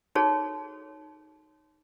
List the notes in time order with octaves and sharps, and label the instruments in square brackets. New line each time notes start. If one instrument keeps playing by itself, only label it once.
[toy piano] D#4 F#4 G#4 A4 C#5